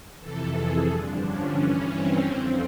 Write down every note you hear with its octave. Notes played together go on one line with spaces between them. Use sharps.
F2 C3 E3 A4
G#4
G2 D3 F3 D4
C#4
G2 E3
C4
F2 D3 F3